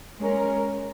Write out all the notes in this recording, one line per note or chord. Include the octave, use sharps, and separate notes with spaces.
G#3 C#4 A#4